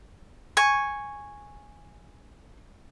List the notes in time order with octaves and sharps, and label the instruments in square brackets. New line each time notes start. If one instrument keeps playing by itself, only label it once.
[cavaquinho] G#5 C#6